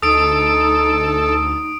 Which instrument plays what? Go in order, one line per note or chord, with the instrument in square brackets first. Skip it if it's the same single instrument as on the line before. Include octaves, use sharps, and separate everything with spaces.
[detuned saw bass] D2 [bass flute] D#4 [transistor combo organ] A4 [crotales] D#6 D7